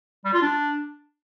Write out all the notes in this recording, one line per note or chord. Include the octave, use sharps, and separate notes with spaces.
G3
F4
D4